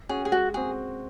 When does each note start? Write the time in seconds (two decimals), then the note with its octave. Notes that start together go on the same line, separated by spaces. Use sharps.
0.09 C#4 F#4 G#4
0.25 G#4
0.32 G#3 F#4
0.54 C4 F#4 G#4